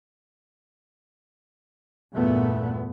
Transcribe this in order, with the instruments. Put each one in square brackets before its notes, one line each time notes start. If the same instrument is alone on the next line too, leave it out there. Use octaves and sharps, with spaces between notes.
[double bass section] E2 G2 A#2 A3 B3